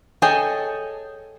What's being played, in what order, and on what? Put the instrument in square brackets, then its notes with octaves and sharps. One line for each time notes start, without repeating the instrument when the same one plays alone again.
[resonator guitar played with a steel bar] G#4 A4 C#5 D#5 G5 G#5